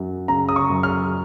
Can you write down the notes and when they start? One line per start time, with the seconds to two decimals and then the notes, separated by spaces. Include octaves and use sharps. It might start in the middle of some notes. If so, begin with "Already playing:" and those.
Already playing: F#2 F#3
0.28 C#3 A#5
0.49 D#6
0.56 C#6
0.70 F#2
0.83 F6